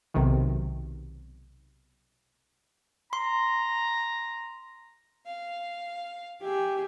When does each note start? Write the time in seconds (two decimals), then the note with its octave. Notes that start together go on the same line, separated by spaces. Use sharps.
0.14 B1 C3 D#3
3.13 A#5 C6
5.26 F5
6.42 G4 G#4 E5